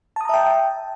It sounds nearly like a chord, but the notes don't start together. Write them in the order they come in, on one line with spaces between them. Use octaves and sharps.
A5 D#6 A#5 E5 G5